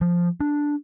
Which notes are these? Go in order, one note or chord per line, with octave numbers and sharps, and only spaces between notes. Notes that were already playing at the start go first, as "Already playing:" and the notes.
F3
D4